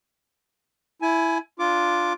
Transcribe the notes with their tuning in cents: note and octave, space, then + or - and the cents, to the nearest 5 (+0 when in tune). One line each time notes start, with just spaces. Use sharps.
E4 +5 G#5 +20
D4 +0 F4 +0 D6 +0